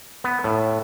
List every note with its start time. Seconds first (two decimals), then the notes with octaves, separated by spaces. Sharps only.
0.24 B3
0.44 A2